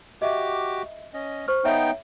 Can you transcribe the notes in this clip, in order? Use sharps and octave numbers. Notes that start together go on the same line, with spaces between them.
F#4 G4 D#5 E5 D6
C#4 D#5
C5 C#6 F6
B3 D#4 C#5 E5 G5